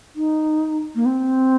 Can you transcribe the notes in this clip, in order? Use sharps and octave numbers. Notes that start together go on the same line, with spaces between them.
D#4
A#3
C4